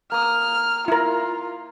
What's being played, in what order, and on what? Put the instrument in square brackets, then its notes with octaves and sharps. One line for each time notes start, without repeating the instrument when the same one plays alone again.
[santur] A#3 D#6 [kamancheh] F6
[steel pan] E4 A#4 [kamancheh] F4